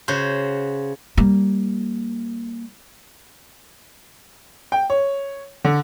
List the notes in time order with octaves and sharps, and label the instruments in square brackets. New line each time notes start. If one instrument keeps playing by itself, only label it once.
[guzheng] C#3 F#4 C5
[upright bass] G3 A#3
[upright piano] G5
C#5
D3